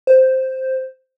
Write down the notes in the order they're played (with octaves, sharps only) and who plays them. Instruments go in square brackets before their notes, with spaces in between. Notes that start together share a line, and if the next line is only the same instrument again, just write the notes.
[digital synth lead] C5